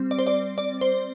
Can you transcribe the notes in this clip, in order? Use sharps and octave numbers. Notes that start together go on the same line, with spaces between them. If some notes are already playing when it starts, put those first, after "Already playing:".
Already playing: G3 C4
D5
C5
D5
D5
C5